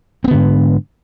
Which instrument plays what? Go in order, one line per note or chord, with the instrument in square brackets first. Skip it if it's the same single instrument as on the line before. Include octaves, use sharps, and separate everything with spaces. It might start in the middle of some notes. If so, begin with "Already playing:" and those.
[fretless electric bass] C4
B3
D3
G#2